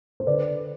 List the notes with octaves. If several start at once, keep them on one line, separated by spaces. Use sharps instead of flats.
C5
D3 B4 D5